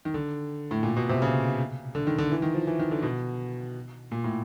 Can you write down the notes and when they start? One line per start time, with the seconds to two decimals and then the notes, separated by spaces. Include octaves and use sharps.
0.05 D#3
0.14 D3
0.71 A2
0.83 A#2
0.96 B2
1.09 C3
1.22 C#3
1.95 D3
2.07 D#3
2.18 D3
2.32 E3
2.42 D#3
2.54 F3
2.67 E3
2.79 D#3
2.91 D3
3.02 B2
4.12 A#2
4.24 A2